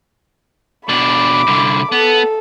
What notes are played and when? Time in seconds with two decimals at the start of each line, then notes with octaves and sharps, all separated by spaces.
0.89 B2 D4 B5 D6
1.47 C2 D3
1.92 B3 A4